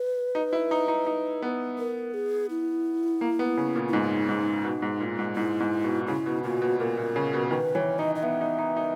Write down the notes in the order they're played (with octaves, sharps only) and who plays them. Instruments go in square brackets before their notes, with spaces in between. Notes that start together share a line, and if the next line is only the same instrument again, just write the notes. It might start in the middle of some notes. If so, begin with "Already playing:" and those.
Already playing: [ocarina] B4
[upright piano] D#4
E4
D#4
D#4
D#4
B3
[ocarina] A#4
G#4
E4
[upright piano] A#3
B3
C#3
A#2
[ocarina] E4
[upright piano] G#2 [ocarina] D#4
[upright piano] G#2
B2
G#2
A#2
G#2
[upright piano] G#2 [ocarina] E4
[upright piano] G#2
B2
[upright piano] C#3 [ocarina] E4
[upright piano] B2
[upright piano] A#2 [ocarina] F#4
[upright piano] B2
[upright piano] A#2 [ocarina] A#4
[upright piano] A#2
C#3
B2
[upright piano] D#3 [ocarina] B4
[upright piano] E3 [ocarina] C#5
[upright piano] D#4 [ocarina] D#5
[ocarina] D#5
[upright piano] B3 [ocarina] E5
[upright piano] D#4
D#4
D#4